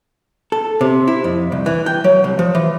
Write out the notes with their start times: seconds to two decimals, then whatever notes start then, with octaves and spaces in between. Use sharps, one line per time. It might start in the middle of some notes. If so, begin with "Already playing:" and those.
0.52 A4
0.81 C3
1.07 E4
1.24 F2
1.52 C2
1.66 E3
1.86 G5
2.04 F#3
2.24 C2
2.39 F3
2.55 E3